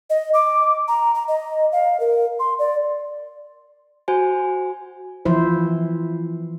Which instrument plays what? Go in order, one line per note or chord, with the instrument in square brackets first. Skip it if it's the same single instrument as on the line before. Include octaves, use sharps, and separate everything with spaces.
[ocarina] D#5
D6
A#5
A#5
D#5
F5
A#4
C6
D5
[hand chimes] F#4 C5 G#5
[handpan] E3 F3 E4 C5